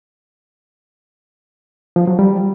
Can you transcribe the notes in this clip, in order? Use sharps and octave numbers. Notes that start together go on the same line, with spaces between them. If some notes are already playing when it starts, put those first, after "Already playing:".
F3
F#3
G3